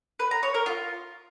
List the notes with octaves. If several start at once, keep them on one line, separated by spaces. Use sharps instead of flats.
B4
A#5
C#5
A#4
F4